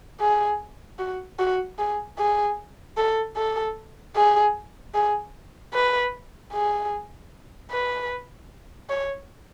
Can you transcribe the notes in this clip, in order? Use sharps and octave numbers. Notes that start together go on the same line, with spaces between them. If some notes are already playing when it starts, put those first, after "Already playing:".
G#4
F#4
F#4
G#4
G#4
A4
A4
G#4
G#4
B4
G#4
B4
C#5